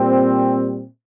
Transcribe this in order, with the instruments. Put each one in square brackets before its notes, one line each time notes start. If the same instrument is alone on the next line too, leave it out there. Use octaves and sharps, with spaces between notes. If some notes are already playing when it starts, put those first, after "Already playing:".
Already playing: [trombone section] A#2 G3 C4